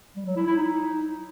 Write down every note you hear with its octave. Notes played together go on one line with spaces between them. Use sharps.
G3
F#3
E4
E4
D#4